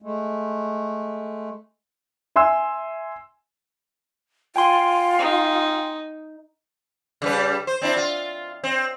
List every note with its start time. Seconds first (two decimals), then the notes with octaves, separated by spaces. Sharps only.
0.02 G#3 A3
2.36 E5 G#5 C6 E6
4.56 F4 G5 G#5 C6
5.19 D#4
7.22 C#3 G3 B4
7.67 C5
7.82 C4 D4 E4
7.97 F4
8.64 C4